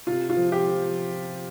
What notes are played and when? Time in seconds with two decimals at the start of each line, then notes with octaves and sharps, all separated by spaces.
0.07 C3 F4
0.30 F4
0.37 F3
0.52 G4
0.68 F3